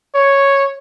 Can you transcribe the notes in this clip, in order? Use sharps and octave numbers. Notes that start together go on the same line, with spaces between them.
C#5